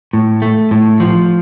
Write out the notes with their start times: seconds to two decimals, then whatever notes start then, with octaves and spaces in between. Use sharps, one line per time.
0.13 A2
0.42 A3
0.71 A2
1.00 F3